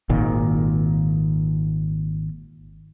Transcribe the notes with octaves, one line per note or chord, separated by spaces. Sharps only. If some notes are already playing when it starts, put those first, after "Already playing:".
G#1 A#2 D#3